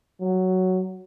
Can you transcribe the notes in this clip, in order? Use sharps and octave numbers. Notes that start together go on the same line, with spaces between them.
F#3